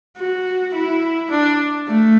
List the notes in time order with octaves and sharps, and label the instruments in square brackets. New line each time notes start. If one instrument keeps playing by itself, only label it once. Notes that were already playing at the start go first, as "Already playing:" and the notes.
[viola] F#4
E4
D4
A3